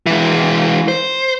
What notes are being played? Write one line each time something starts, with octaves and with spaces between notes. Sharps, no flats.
E3 G#3
C5